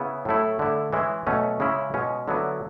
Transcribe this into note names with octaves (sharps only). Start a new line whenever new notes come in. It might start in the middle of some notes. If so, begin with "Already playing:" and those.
Already playing: C#3 B3 E4
A2 F#3 A3 E4
D3 A3 E4
E3 G#3 C#4 E4
B2 F#3 A3 C#4
C#3 G#3 C#4 E4
B2 G#3 C#4
D3 F#3 B3 E4